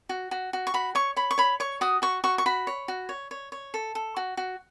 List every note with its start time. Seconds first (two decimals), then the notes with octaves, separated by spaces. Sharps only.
0.09 F#4
0.31 F#4
0.53 F#4
0.67 C#6
0.74 F#4 B5
0.95 C#5 C#6
1.16 C#5 B5
1.31 C#6
1.38 C#5 B5
1.60 C#5 C#6
1.81 F#4 D#6
2.02 F#4 C#6
2.24 F#4 C#6
2.38 C#6
2.46 F#4 B5
2.67 C#5
2.88 F#4
3.09 C#5
3.31 C#5
3.52 C#5
3.74 A4
3.95 A4
4.16 F#4
4.37 F#4